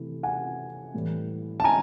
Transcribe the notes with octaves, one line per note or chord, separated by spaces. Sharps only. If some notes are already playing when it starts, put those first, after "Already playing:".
Already playing: C3 E3 A3
F#5 G#5
A2 E3 G3
A5
G#5 A#5